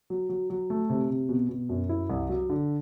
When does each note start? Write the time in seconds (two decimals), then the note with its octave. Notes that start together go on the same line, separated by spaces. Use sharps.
0.10 F#3
0.29 F#3
0.50 F#3
0.70 A3
0.90 C3
1.10 C3
1.29 B2
1.49 B2
1.69 F#2
1.89 E4
2.10 C2
2.29 F#3
2.50 D3